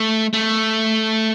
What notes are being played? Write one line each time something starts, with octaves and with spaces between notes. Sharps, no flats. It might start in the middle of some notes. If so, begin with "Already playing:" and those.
Already playing: A3
A3